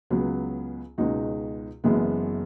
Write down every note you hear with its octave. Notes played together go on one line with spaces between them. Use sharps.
C#2 C#3 F#3 B3
C#2 B2 G#3 D#4 F#4
F#1 F#2 E3 G#3 B3